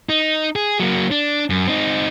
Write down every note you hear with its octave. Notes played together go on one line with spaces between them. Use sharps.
D#4
G#4
F#3 A#3
D4
F#2
C4 D#4